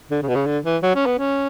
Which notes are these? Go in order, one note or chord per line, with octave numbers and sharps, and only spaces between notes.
D3
C#3
B2
C#3
D3
E3
F#3
C#4
B3
C#4